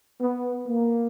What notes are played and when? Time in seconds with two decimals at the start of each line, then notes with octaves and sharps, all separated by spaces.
0.21 B3
0.67 A#3